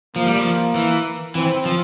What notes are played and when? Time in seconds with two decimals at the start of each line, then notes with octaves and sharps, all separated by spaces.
0.16 F3 A#3
0.26 G3
0.37 F3
0.76 E3
1.35 E3 C4
1.65 F3